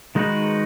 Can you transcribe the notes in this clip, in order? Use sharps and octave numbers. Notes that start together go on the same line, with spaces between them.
D#3 G#3 D#4 F#4 B4